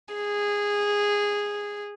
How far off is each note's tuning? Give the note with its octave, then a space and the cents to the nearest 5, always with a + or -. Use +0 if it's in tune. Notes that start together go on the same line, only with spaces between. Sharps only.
G#4 -15